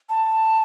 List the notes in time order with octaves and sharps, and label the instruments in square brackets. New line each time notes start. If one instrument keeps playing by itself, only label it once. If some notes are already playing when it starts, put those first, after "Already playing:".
[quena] A5